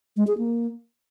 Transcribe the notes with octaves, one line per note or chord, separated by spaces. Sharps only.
G#3
G#4
A#3